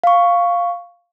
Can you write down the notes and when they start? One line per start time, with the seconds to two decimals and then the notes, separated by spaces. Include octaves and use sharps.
0.04 F5 C#6